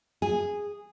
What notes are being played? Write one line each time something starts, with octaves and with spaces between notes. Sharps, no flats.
G#4